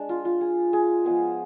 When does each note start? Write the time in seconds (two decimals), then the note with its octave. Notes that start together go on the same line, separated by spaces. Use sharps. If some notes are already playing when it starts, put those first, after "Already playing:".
Already playing: G#3 D4
0.09 F4
0.25 F4
0.41 G#4
0.73 G#4
1.05 F3 G#3 B3 G#4